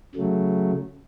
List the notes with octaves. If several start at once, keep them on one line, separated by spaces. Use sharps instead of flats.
C#3 F#3 A3